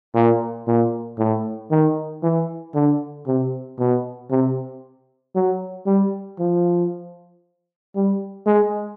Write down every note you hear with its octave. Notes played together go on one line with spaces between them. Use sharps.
A#2
A#2
A2
D#3
E3
D3
C3
B2
C3
F#3
G3
F3
G3
G#3